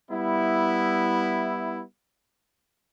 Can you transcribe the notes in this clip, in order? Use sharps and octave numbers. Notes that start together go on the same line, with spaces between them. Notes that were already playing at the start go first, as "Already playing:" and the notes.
G3 B3 E4